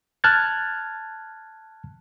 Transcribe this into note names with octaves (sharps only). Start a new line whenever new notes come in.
A5 F6 F#6 G#6 A6